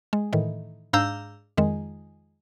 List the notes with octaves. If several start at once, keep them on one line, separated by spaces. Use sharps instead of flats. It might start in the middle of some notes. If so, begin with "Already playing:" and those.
G#3
A2 D#3 E3
G#2 D4 F5 A#5 E6 G6
F2 D#3 G#3